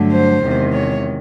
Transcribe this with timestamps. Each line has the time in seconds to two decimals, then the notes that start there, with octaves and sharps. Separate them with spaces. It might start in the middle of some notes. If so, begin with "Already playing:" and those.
Already playing: G2 D3 F#3 A3
0.12 C5
0.44 E2 C3 D#3 G#3
0.73 C#5